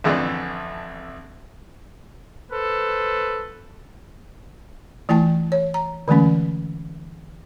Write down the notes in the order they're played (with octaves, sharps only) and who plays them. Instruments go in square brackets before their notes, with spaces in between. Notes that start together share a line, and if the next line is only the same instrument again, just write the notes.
[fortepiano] A1 F2 D3 E3 A3 D5
[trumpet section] A4 B4 C5
[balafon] E3 A3 E4 G5 A5
C#5
A#5
D3 E3 G#3 A3 C#4